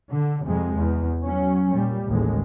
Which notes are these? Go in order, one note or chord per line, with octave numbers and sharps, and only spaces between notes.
D3
F2 C3 G#3
E2
F#3 C#4
A#2 G3
A1 D#2 D3 G#3